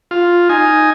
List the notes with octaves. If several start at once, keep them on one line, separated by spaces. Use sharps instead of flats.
F4
D#4 G#5